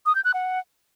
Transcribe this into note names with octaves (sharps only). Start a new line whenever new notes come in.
D#6
G6
F#6
F#5